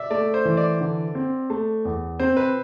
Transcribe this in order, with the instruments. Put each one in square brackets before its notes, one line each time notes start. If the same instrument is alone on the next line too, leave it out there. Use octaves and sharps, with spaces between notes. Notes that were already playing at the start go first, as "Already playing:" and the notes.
Already playing: [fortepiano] D5 E5
[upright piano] A3 [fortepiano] D5
[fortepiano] C5
[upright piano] E3
[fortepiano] D5
[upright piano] D3
C4
A3
E2
[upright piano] C4 [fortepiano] C5
[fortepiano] B4